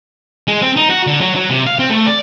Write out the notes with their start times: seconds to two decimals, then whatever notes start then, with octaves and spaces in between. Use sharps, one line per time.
0.48 G#3
0.62 C4
0.76 D#4
0.90 F#4
1.07 D3
1.21 F#3
1.36 F#3
1.50 C3
1.67 F5
1.79 C4
1.90 A3
2.07 D5